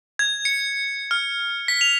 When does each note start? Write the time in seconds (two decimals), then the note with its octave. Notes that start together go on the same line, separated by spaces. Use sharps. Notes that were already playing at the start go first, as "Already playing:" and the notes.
0.19 G#6
0.45 C#7
1.11 F6
1.68 B6
1.81 F7